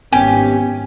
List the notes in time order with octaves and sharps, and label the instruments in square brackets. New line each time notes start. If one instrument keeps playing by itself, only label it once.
[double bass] G#1 C#4 [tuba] B3 [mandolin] G4 [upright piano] G#5